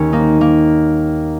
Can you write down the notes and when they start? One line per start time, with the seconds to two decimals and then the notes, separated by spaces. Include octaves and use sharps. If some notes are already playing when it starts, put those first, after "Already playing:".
Already playing: D#2 D#3 C#4
0.13 A#3 D#4
0.41 A#3